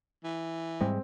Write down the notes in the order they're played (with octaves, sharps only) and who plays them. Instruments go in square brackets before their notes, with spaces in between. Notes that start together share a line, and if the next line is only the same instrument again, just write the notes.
[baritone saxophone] E3
[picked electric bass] G#2 G3 G#3 [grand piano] C4